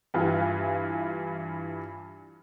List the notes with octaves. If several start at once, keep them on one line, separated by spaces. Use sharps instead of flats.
G2 E3 F4